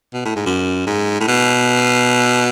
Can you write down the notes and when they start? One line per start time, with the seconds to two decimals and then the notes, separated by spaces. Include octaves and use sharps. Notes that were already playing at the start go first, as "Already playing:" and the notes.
0.13 B2
0.25 A2
0.36 G#2
0.46 F#2
0.87 G#2
1.20 A2
1.27 B2